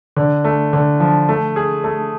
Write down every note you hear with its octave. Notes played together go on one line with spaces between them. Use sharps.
D3
A3
D3
F3
A3
G#4
A3